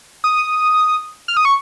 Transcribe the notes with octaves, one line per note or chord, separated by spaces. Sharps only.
D#6
F6
D#6
C#6